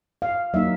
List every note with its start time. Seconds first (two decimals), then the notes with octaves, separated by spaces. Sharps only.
0.22 F5
0.54 F#3 A#3 D#4 E5